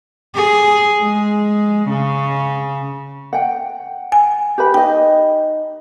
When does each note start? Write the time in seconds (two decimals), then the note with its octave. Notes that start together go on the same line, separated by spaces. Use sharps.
0.35 G#4
1.01 G#3
1.90 C#3
3.33 F#5 G5
4.12 G#5
4.58 G4 B4 B5
4.74 D#4 D#5 G5